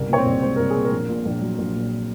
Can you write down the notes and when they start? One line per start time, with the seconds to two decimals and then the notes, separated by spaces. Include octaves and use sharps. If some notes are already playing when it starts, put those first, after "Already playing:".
Already playing: C2 C#3 A#4
0.09 A#2 C#5
0.18 C4 C5
0.26 C2
0.42 G#3 C5
0.56 C2 A#4
0.70 G#4
0.76 A#2
0.84 A#4
0.92 A#1
1.08 A#2
1.25 A#1
1.41 F#3
1.58 A#1
1.75 A#2